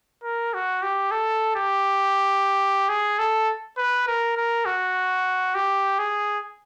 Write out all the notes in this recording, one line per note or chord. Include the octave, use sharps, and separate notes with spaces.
A#4
F#4
G4
A4
G4
G#4
A4
B4
A#4
A#4
F#4
G4
G#4